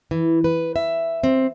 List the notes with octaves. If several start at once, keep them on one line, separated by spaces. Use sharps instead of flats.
E3
B4
E5
C4